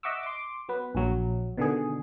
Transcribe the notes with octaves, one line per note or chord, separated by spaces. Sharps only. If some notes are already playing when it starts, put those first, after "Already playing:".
D#5 E5 F#5 C#6 D6 E6
C6 D6
F#3 B3 B4
A#1 F#3
B2 D3 D#3 G#4